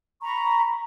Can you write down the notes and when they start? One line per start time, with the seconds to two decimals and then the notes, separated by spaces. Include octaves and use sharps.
0.22 A#5 B5 C#6